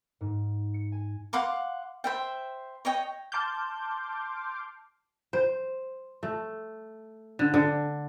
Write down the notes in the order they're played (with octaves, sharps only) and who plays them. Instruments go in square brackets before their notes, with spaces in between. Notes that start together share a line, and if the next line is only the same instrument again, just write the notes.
[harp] G#2
C#7
G#5
[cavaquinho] F5 F#5 C6 D6
C5 E5 G5
C#5 D#5 G5
[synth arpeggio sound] A5 C6 D6 F6 G6
[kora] C5
A3
D3
D3